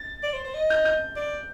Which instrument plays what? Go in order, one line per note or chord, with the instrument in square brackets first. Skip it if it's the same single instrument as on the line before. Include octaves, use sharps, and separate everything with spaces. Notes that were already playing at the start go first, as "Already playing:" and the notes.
Already playing: [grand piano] A6
[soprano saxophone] D5
C5
C5
D#5
[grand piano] G6
G6
[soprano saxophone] D5